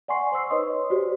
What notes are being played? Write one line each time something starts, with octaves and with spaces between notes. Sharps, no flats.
D5 F#5 G#5 C6 C#6 C7
C5 C#6 E6 C7
D#4 B4 C#5 D#5 C6 D#6
F#4 G4 C5 D5